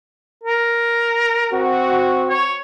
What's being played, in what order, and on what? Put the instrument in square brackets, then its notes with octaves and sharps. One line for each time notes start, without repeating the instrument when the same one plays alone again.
[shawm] A#4
[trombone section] C4 F#4
[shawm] C#5